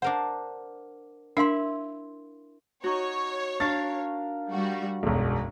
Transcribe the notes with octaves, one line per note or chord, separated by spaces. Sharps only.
D4 A#4 C5 F#5
D4 E4 A#4 E5 F5 C6
D#4 F#4 C#5
D4 A#4 F5 A6
G3 F#4
E1 B1 F#2